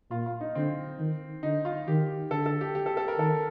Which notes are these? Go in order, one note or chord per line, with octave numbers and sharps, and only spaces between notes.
A#2 F4
F4
D#4
D3 C4
D#3
D3 D#4
F4
D#3 G4
D3 A4
A4
G4
G4
A4
A4
A#4
D#3 A4